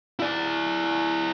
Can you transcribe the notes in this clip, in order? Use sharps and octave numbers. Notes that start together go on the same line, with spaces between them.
E4 D5